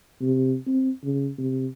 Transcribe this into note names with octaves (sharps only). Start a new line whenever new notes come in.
C3
C4
C#3
C3